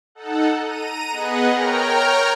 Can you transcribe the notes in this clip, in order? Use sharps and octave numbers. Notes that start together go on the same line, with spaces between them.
D#4 A4 F#5
A#5 D#7
B3 G#4 B4 D#5 F#5
A#4 C#5 G5 A#5 F6